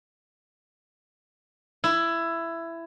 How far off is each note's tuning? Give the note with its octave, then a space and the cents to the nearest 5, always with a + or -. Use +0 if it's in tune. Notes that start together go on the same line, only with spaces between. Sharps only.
E4 +15